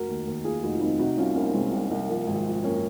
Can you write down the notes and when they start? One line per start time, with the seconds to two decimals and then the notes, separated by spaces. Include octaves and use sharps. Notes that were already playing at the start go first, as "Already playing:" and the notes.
Already playing: F1 F#4 A#4
0.08 D#2
0.27 D#2
0.45 D#2 F4 G#4
0.63 F1 D#4 F#4
0.75 F4
0.81 D#2 C4 D#4
0.99 C3 D#4 F#4
1.17 C2 C#4 F4
1.35 C2 A#3 C#4
1.53 C2 G#3 C4
1.71 C2
1.91 C2
2.08 F3 A#3
2.27 G#1
2.45 F3
2.62 F#2 A#3 C#4